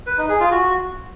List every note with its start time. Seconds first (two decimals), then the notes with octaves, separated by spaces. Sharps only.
0.07 B4
0.18 D#4
0.29 G#4
0.40 F4
0.51 F#4